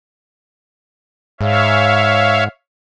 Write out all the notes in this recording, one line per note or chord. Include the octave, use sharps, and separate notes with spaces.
G#2 C#5 E5 F5